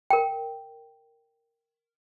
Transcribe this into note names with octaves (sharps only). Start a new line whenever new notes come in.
A#4 G5